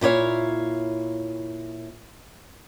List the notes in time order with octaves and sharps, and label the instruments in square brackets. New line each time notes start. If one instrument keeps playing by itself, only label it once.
[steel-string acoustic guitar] A#2 E4 F#4 C#5 F5